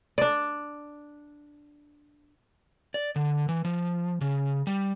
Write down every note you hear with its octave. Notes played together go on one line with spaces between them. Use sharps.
D4 D5
D5
D3
E3
F3
C#3
G3